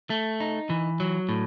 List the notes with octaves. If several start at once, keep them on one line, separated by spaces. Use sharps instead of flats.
A3
D#4
E3
F#3
A2